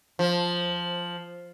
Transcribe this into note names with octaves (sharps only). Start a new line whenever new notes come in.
F3